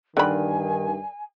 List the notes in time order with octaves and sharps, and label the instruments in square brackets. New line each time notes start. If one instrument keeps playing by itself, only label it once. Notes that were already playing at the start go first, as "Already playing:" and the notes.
[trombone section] G2 D#3 [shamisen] D3 B5 [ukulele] A#4 D5 G5 [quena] G#5